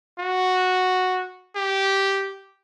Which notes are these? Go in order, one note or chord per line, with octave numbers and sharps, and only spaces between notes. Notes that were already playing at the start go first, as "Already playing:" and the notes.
F#4
G4